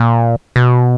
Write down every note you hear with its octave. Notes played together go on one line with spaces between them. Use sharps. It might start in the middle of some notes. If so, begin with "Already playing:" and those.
Already playing: A#2
B2